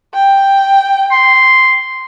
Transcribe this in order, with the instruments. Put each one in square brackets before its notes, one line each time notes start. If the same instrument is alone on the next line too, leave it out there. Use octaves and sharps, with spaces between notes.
[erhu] G5
[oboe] C6